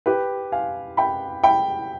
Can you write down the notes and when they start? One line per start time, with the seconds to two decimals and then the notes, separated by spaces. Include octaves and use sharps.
0.06 G4 B4
0.52 F5 G#5
0.97 G5 B5
1.44 G5 B5